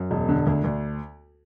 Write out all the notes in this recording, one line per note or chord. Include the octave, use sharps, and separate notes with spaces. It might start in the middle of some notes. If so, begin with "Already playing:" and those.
Already playing: F#2
E1
D3
D2
D2